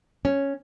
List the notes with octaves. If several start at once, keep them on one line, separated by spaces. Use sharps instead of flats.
C#4